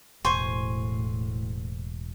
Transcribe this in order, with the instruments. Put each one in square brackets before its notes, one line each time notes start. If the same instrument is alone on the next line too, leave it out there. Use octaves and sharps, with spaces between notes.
[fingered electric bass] E1 [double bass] A2 [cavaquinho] C5 G#5 C#6